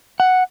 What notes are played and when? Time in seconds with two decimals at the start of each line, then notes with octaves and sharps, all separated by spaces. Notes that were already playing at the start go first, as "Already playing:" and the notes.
0.20 F#5